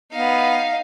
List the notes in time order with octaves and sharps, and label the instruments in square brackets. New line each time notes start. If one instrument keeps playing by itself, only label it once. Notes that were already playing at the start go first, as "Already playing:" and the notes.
[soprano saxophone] B3 [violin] D#4 F5